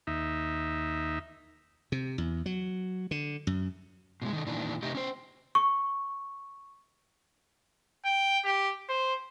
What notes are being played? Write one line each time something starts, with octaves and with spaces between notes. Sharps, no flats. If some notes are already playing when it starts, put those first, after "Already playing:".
D#2 D#4 E5
C3
E2
F#3
D3
F#2
B2 D3 G#3
D#3 A4
A#2 D#3 E3 D4
C3 A3 D#4 G4
C#4 C5
C#6
G5
G4
C5